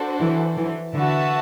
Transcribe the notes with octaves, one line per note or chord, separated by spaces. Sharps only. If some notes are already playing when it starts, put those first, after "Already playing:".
Already playing: D4 F#4 A4 C5
E3
E3
D3 F#4 B4 E5 A5